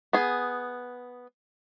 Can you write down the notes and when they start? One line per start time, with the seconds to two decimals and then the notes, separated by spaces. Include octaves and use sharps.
0.13 B3 G#4